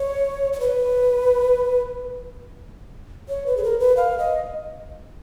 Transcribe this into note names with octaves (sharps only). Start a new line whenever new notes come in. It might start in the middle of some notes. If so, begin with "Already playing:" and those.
Already playing: C#5
C#5
B4
C#5
B4
G#4
A#4
B4
F5
D#5